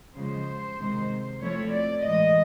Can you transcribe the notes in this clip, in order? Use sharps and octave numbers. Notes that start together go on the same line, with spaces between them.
C#3 F3 G#3 C5
C3 D#3 G#3
F3 A3 C4 E4 C#5
D5
A2 E3 G#3 D#5